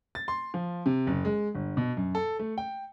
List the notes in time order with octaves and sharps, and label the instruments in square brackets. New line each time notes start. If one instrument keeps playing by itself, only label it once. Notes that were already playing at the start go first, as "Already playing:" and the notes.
[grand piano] A6
C6
F3
C3
F#1
G#3
G1
B2
F#2
A4
A3
G5